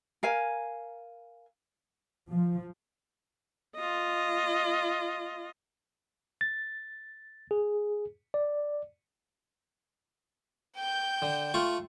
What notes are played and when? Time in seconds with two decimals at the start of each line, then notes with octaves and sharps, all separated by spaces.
0.23 A#4 F5 G#5
2.30 F3
3.75 F4 D#5
6.41 A6
7.51 G#4
8.34 D5
10.77 G5 G6
11.22 D3
11.54 A3 F4 C#6